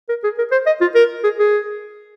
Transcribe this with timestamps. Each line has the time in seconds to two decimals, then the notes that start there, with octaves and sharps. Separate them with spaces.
0.09 A#4
0.23 G#4
0.38 A#4
0.52 C5
0.66 D#5
0.81 F4
0.95 A#4
1.24 G#4
1.38 G#4